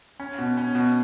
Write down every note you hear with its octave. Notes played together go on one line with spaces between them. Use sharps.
C#4
B2
C#4
B2